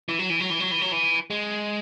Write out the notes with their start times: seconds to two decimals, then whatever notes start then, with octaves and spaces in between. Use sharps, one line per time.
0.09 E3
0.19 F#3
0.30 E3
0.40 F#3
0.50 E3
0.60 F#3
0.71 E3
0.81 F#3
0.92 E3
1.30 G#3